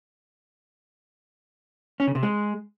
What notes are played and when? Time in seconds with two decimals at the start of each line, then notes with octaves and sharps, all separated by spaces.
2.00 C#4
2.07 C#3
2.15 C3
2.23 G#3